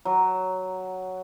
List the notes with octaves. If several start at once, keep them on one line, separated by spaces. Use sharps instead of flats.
F#3